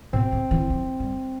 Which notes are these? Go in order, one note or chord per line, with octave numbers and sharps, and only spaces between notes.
B2 C4
C3
E3
F3
G3